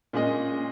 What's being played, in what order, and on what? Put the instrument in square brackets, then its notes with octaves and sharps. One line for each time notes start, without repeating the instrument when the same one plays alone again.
[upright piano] A#2 G#3 C#4 G#4 D#5